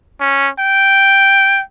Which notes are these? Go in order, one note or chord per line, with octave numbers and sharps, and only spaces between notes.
C#4
G5